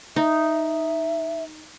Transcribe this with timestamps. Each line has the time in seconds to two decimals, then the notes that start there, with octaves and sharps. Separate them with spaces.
0.16 D#4 E5